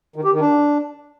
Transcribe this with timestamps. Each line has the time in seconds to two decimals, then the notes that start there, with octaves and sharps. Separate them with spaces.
0.16 D#3
0.24 G4
0.32 D#3
0.41 D4